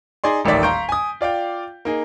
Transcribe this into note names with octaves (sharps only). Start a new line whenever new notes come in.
D#4 G#4 D5 C6
D#1 A1 D#3 A3 D5 B6
F5 A#5 C6 C#6 G6 D7
G#5 D#6
F4 D5 F5 G5
A#3 D#4 G#4